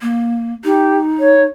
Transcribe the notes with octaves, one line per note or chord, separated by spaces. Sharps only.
A#3
D#4 G4
C#5